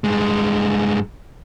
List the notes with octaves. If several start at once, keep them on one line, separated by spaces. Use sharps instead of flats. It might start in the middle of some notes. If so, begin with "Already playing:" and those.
G2 G#3